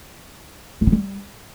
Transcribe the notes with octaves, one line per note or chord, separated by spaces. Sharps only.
A2
B3
G3